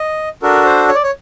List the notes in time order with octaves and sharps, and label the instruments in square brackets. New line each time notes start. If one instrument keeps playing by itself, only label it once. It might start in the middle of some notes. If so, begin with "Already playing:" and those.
Already playing: [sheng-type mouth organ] D#5
D4 F#4 A4 A#4
C5
C#5
D5
C#5